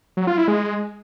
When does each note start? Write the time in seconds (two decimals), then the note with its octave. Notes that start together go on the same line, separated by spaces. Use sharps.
0.17 F#3
0.27 F4
0.38 E4
0.48 G#3